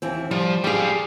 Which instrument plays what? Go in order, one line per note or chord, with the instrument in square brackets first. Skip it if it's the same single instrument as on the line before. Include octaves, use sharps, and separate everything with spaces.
[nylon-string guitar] D#2 E3 C4
[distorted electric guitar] F3 [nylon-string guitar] G3
[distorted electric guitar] G3 F5 [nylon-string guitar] G4 G#4